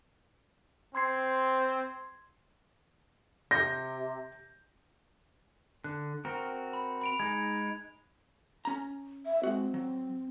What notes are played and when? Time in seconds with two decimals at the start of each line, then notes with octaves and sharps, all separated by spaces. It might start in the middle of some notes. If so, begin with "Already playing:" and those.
0.95 C4 C6 G#6 C7
3.51 C3 G6 A#6
5.84 D3 F#6
6.25 C4 F#4 A#4
6.73 B5
7.01 B5 D7 F7
7.20 G#3 D#4 G#6
8.65 C#4 A#5
9.26 E5
9.43 G#3 C4 F#4
9.74 F#3